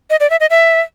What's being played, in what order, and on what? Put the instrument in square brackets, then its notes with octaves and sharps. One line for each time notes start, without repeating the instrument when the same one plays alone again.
[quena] D#5
D5
E5
D#5
E5